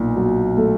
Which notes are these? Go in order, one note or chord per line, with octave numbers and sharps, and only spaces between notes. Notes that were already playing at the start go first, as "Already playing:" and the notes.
Already playing: B1 A#2
F#3
A3